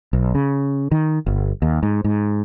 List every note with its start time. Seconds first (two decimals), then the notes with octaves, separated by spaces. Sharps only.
0.13 B1
0.35 C#3
0.91 D#3
1.26 G1
1.62 D#2
1.83 G#2
2.04 G#2